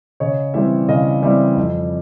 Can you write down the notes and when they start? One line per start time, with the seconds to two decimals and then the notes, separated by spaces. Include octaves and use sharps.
0.20 C#3 C#5 D#5
0.54 E3 G3 C4 D5 E5
0.88 C#3 D#5 F5
1.22 E3 G3 C4 D5 E5
1.56 F2